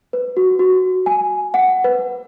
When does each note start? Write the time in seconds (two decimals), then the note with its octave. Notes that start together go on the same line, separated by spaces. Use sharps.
0.13 B4
0.37 F#4
0.59 F#4
1.06 G#5
1.54 F#5
1.84 B4